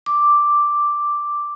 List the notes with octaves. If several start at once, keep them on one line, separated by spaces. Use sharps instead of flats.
D6